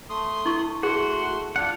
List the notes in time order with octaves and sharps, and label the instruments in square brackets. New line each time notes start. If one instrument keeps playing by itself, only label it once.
[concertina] A3 C6 D#6
[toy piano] E4 C#6
[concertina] A3 C6 [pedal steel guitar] F#4 [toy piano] G#4
[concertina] D4 [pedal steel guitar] F4 F#5